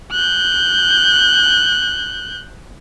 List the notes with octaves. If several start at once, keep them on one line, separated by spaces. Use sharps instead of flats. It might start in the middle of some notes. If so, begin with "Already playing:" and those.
F#6 G6